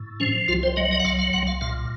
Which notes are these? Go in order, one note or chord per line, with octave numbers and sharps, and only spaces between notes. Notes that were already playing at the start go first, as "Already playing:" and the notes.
Already playing: A2
F3 C#4
C2 F4
C5
F#3 D#5
D#5
F#5
C2 F5
F5
C2 F#5
F5
A#2 F5